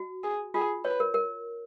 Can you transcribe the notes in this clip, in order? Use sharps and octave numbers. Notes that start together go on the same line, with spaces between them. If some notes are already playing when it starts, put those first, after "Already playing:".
Already playing: F#4
G#4
F4 G#4
B4 C#5
A#4
A#4